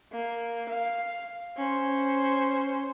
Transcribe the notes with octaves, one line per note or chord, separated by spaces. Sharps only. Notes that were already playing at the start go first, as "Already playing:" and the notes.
A#3
F5
C#4 C5